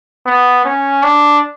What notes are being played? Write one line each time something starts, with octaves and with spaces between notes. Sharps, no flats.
B3
C#4
D4